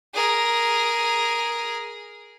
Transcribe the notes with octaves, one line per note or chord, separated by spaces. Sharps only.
G#4 A#4